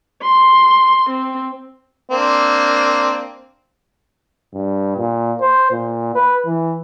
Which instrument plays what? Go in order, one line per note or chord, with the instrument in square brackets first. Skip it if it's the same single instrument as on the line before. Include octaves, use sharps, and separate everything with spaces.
[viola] C6
C4
[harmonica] A#3 C4 D4
[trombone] G2
A#2
C5
A#2
B4
E3